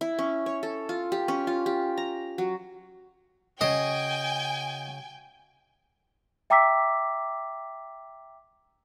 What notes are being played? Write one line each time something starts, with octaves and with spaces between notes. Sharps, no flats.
E4
C#4
C#5
A4
F4
G4
C#4
F4
G4
A#5
F#3
C#3 F#4 D#5 G5 G#5
E5 G5 A#5 D6 E6 B6